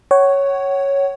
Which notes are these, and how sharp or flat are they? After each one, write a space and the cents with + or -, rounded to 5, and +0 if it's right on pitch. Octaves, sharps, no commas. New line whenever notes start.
C#5 +0 F#5 +30